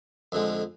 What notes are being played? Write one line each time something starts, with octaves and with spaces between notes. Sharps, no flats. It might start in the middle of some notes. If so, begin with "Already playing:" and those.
F2 D3 G#3